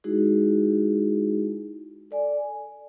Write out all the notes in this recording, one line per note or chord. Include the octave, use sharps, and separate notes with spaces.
G#3 D#4 E4 F#4 G#4
A4 D5 G#5
D5